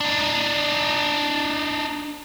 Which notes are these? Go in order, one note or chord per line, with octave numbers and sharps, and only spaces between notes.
D4 D#4